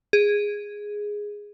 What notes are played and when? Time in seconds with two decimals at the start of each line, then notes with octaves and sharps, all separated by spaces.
0.13 G#4